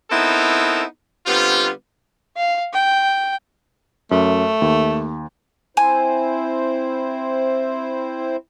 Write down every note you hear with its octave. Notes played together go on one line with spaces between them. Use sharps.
B3 C4 D#4 E4 A4 A#4
D3 G3 B3 C4 F4
F5
G5
F#2 A3
D#2
C4 E4 C5 G#5